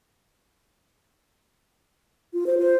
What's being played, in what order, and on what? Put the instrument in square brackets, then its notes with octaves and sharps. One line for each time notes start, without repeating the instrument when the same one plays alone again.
[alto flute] F4
C5
[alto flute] F4 [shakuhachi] C5